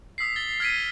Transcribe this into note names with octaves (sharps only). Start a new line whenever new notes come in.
D#6 E6 B6 C7
A6 G7
F6 G#6 B6 D7 D#7